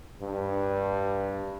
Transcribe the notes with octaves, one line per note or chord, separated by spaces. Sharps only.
G2